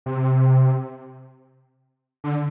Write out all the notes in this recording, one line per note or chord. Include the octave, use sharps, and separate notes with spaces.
C3
D3